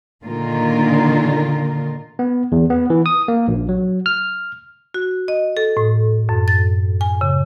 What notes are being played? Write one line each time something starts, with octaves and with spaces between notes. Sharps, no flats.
A#2 D3 D#3 A#3 F4 A#4
B3
E2
B3
E3
D#6
A#3
A#1
F#3
F6
F#4
D#5
A4
A2
F#2
A6
G#5
C#3